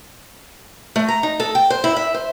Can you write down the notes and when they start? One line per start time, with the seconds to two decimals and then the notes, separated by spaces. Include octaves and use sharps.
0.96 A3
1.08 A#5
1.23 D#4
1.40 A4
1.55 G5
1.70 C5
1.84 E4
1.97 E5
2.14 C5